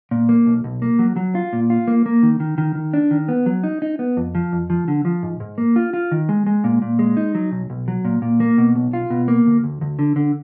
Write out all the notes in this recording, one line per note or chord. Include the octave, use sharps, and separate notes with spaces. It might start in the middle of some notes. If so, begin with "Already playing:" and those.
A#2
A#3
B1
B1
A#3
F#3
F#3
F4
A#2
F4
A#3
A#3
D#3
D#3
D#3
D#3
D4
D#3
B3
F#3
D#4
D#4
B3
F2
F3
F2
F3
D3
F3
G#2
G#2
A#3
F4
F4
D#3
G#3
G#3
A#2
A#2
G#3
D#4
F#3
B1
B1
F#3
A#2
A#2
A#3
B2
B1
F4
B2
A#3
D2
D2
D2
D3
D3